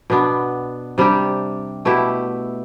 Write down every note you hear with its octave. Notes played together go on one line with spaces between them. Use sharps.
B2 B3 D4
C3 G3 D4 G4
B2 A3 E4 G4